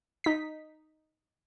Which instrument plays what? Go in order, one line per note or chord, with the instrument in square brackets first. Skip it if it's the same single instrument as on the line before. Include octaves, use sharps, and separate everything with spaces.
[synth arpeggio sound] D#4 B6